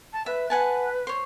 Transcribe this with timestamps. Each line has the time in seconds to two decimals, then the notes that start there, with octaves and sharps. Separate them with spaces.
0.13 A5
0.26 B4 E5
0.50 B4 F#5 G#5 A5
1.07 C5 C#5